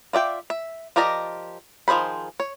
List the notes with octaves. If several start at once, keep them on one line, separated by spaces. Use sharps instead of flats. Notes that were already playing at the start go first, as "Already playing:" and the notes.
F4 D5 E5 G5
E5
F3 G4 A#4 D5 D#5
D#3 F3 G#4 C5 B5
C#5